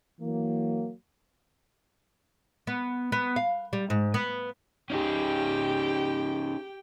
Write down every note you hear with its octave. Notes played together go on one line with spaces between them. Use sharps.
E3 F#3 A#3
B3
B3
F5
G3
G#2
B3
C#4 D#4 G4 G#4 G5